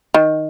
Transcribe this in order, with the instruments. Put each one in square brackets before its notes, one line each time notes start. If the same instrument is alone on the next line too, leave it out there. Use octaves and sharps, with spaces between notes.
[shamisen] D#3